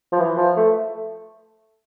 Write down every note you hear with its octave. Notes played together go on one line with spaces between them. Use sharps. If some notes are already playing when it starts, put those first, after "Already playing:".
F3
E3
F3
A3